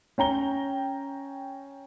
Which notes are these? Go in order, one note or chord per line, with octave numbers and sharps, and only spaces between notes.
C#4 G5 A#5 G7